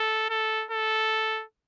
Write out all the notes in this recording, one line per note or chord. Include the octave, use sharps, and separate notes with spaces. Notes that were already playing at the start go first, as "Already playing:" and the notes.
Already playing: A4
A4
A4